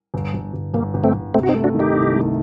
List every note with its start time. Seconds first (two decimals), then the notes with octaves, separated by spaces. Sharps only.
0.14 G1
0.34 G1
0.53 G1
0.74 G1 A#3
0.94 G1
1.04 A3 C4
1.14 G1
1.34 C3 A3 C4
1.43 F#4
1.49 C4 D#4
1.55 A3
1.64 D4 F#4
1.74 D#3
1.79 D#4 G4
1.94 C2
2.15 A3